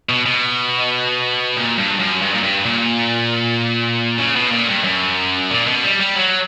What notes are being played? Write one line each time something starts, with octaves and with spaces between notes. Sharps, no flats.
B2
B2
A#2
G2
F#2
G2
A#2
G2
A#2
C#3
B2
A#2
G2
F#2
A#2
B2
G3
G3
F#3